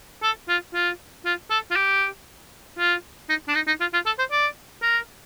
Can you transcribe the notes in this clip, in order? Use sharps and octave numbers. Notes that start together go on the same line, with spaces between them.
A4
F4
F4
F4
A4
F4
G4
F4
D#4
D4
D#4
D#4
F4
F4
A4
C5
D5
A#4